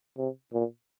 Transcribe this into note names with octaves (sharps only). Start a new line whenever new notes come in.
C3
A#2